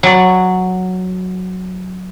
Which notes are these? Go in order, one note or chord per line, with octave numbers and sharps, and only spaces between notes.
F#3 D5